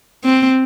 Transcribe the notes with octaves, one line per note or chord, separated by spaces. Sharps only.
C4